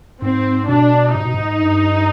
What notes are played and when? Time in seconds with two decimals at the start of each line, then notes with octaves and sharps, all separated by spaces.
0.22 G#2 C4
0.69 B2 D4
1.15 G#2 D#4
1.25 B2
1.34 G#2
1.62 G2